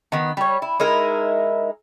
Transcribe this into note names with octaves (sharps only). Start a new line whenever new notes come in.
D#3 B3
G3 C#5
E4
G#3 D#4 E4 A#4